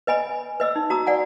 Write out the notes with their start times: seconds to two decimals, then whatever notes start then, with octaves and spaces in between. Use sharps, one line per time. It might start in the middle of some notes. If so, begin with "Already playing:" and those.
0.07 B4 D#5 G#5 B5
0.60 B4 D#5 E6
0.76 D#4
0.90 F#4 A#5 D#6 E6
1.07 D5 F#5 G#5